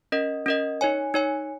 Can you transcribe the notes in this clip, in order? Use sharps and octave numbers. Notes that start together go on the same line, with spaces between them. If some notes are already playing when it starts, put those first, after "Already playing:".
C#4 A#4 D#5
C#4 A#4 D#5
D#4 C#5 G#5
D#4 C#5 G#5